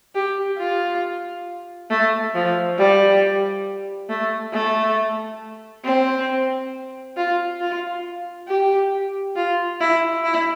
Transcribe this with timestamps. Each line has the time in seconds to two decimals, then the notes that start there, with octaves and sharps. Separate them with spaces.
0.15 G4
0.58 F4
1.90 A3
2.35 F3
2.79 G3
4.10 A3
4.54 A3
5.85 C4
7.17 F4
7.61 F4
8.48 G4
9.36 F4
9.81 E4
10.24 E4